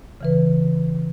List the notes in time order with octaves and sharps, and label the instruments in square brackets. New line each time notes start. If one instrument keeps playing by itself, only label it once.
[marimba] C#3 E3 B4